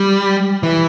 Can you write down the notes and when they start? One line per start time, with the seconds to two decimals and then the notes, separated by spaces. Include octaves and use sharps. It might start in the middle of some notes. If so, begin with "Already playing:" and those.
Already playing: G3
0.63 E3